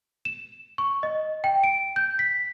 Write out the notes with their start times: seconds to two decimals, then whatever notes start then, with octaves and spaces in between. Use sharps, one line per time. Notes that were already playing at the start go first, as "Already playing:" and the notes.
0.25 E7
0.78 C#6
1.03 D#5
1.44 G5
1.64 D7
1.96 G6
2.19 B6